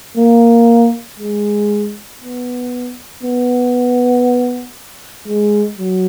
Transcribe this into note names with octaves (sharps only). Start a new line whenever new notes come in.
A#3
G#3
B3
B3
G#3
F#3